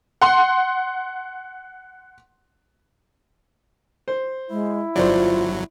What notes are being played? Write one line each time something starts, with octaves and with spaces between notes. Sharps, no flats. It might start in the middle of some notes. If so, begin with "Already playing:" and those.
F#5 C6
C5
G#3 E4
G1 F#3 F4 C5 D5